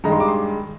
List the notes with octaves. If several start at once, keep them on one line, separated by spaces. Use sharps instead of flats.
G2 D#3 G#3 D#4 A#5
C6
D6
C6